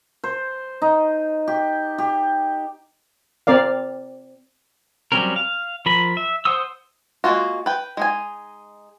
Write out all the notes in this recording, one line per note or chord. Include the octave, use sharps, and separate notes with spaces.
C5
D#4
G4
G4
C4 A#4 D5 F5
F#3 G3 C4 C#4 A#4
F5
F3 A#4 B5
E5
C5 F#5 D#6 E6
G#3 A#3 F4 F#4
B4 G5
G#3 D#4 G#5